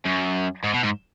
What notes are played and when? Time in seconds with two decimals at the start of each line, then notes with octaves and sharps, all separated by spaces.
0.06 F#2
0.64 G#2
0.74 B2
0.83 G#2